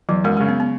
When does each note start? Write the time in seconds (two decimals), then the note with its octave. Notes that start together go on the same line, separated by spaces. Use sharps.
0.09 E2 F#3
0.24 F#2 G#3
0.37 C#3 G#3
0.48 B3
0.60 B3